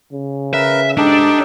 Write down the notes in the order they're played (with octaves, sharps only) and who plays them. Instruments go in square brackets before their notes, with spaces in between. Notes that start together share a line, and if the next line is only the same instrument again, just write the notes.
[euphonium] C#3
[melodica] A#4 B4 [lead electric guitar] E5
[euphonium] G#2 [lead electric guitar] D4 [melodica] D#4 G4 A4